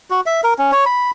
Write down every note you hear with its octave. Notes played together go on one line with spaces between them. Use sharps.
F#4
E5
A#4
C#4
C#5
B5